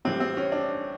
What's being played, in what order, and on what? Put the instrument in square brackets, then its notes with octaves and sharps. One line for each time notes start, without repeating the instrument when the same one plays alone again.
[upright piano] A2 E3 G3 C4
C4
C#4
D4